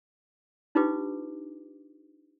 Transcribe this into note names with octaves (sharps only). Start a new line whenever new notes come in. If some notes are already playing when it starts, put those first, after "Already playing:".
D4 D#4 F4 G4 B4 D6